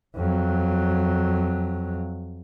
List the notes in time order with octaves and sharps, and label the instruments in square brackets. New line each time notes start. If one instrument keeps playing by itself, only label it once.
[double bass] F2 F#3